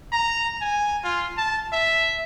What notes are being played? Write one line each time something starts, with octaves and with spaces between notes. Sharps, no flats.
A#5
G#5
F4
A5
E5